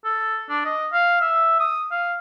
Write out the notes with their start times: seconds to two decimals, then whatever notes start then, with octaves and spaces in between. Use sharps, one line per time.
0.05 A4
0.50 D4
0.65 D#5
0.93 F5
1.21 E5
1.60 D#6
1.92 F5